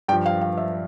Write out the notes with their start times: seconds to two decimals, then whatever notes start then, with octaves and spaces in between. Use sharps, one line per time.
0.08 G2 G5
0.13 F3
0.26 F5
0.41 F5
0.58 E5